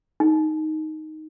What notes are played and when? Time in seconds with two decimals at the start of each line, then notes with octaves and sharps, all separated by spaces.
0.20 D#4